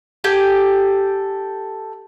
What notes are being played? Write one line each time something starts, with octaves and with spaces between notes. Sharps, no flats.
G4 A4 G#5